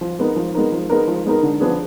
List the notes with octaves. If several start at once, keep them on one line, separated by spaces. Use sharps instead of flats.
F3
G#3 B3 D#4 A#4
F3
G#3 B3 D#4 A#4
F3
G#3 B3 D#4 A#4
F3
G#3 B3 D#4 A#4
D3
F3 B3 D4 G#4